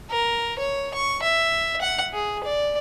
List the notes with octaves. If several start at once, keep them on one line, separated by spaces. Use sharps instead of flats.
A#4
C#5
C#6
E5
F#5
G#4
D5